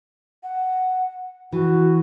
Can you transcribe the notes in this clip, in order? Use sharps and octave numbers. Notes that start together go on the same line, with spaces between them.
F#5
E3 F#4